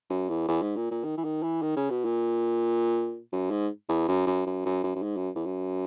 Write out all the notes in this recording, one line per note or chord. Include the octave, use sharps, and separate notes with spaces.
F#2
E2
E2
G#2
A#2
A#2
D#3
E3
D#3
E3
D#3
C#3
B2
A#2
F#2
G#2
E2
F#2
F#2
F#2
F#2
F#2
F#2
G#2
F#2
E2
F#2